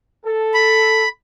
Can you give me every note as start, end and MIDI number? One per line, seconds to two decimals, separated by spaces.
0.25 1.05 69
0.54 1.09 83